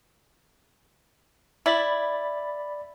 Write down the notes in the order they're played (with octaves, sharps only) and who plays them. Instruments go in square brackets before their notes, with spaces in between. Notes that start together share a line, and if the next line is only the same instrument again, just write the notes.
[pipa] E4 [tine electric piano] D5 B5 A6